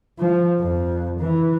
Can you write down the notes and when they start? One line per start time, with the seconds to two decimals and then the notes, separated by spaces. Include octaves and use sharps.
0.18 F3
0.59 F2
1.20 E3